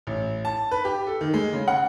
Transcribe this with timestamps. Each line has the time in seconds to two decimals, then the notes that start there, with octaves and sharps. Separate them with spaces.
0.07 A1
0.45 A5
0.71 B4
0.85 G4
1.07 A4
1.21 D#3
1.34 G#3
1.53 C#3
1.68 F#5